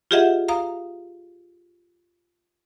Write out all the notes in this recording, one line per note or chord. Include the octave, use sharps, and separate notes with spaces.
F4 G4 G#4 D#5 E5 F#5
F5 A#5 D#6